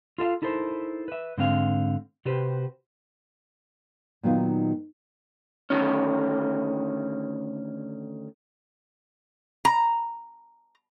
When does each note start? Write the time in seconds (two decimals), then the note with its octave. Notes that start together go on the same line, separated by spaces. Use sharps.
0.18 F4 A4 E5 F5
0.42 D#4 E4 A4 A#4 C5
1.08 B4 E5
1.38 G#2 D3 C4 F5
2.25 C3 F#4 G4 B4 C5
4.23 A#2 D#3 F#3 B3 D#4 F4
5.70 D2 D#3 C#4
9.65 A#5